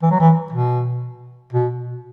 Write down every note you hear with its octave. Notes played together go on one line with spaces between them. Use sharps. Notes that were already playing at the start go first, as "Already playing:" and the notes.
E3
F#3
E3
B2
B2